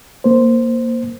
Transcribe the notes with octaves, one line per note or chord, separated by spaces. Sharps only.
A#3 C5